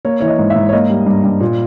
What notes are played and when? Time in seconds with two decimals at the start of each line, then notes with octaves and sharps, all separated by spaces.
0.05 A#3 C#5
0.20 E3 C#5
0.28 D#5
0.39 G#2
0.50 E5
0.56 G#2
0.69 C#5
0.73 A#3 D#5
0.90 G3
1.07 G2
1.24 G2
1.41 A#2